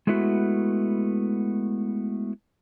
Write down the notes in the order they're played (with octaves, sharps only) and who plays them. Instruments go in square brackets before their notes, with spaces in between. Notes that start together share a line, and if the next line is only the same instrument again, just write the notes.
[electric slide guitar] G#3 A3 B3 E4 F#4